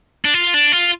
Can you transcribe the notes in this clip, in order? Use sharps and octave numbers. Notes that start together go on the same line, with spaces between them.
D4
F4
D4
F4